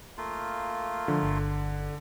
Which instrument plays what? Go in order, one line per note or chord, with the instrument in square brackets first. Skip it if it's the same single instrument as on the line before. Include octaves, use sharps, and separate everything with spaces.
[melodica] A3 A#3 F4
[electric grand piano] D3 [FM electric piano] F3
[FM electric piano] G1